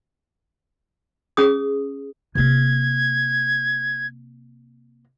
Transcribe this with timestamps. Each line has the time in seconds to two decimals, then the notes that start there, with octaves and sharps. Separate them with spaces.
1.37 C#4 G#4 D#6
2.35 C3 A#3 G#6